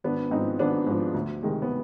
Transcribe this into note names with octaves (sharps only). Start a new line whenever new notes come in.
G#1 B3 D4
G#2 F3 C4 D#4
G#1 B3 D4
G#2 F3
D2
C3 D#3 G#3
B3